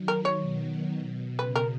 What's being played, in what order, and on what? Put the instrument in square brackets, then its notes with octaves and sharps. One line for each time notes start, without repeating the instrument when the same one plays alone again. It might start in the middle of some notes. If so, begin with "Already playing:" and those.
Already playing: [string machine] D#3 F#3
[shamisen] A#4
C#5
[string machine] B2
[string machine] C#3 [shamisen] B4
[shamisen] A#4